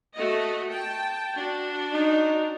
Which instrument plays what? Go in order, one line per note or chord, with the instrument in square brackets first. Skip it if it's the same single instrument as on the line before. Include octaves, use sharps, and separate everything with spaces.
[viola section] A3 F#4 D#5
G5 A5
D4 F#4
[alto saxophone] D#4